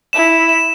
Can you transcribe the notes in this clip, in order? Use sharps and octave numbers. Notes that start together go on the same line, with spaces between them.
E4 E7
E7